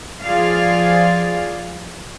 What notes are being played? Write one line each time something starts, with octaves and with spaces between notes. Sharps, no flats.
F3 F4 G#4 D5 F5